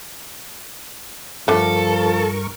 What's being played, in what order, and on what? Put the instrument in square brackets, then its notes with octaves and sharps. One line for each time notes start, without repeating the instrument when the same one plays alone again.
[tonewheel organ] G2 A#4 C#6 [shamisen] D3 A3 [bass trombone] F3 [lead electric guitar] A4